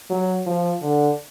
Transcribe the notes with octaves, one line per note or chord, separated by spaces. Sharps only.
F#3
F3
D3